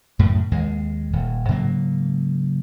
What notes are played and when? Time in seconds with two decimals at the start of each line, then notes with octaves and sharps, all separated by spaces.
0.19 F#2 A2 C#3
0.52 D#2 G#3
1.13 D#1
1.48 G#2 C#3 F#3 A#3